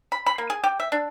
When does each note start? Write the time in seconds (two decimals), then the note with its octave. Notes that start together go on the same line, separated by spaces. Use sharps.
0.12 B5
0.26 B5
0.38 A#3
0.50 G#4
0.64 G4
0.80 E5
0.92 D4